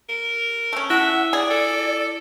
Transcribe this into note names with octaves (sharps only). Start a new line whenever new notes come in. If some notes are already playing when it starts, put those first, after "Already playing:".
A#4
A3 C#4
E4 E5 F#5
G#4 D5
A4